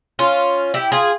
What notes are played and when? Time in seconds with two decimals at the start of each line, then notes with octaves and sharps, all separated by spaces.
0.19 C#4 F4
0.74 E4 G4
0.92 F4 G#4